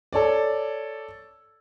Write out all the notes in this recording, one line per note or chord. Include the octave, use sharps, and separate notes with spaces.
A4 C#5 D5